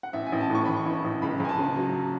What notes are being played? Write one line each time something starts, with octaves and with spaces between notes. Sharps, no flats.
F#5
A1 E5
G#5
A1
A5
A2 C#6
E3 B5
C#6
A1
A1
C#2 B5
C#2 G#5
A5
C#3
F#3